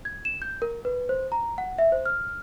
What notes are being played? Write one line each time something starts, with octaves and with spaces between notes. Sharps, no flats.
G#6
E7
G6
A#4
B4
C5
A#5
F#5
E5
C5
F6